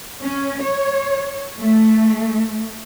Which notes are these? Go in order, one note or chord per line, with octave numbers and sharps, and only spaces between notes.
C#4
C#5
A3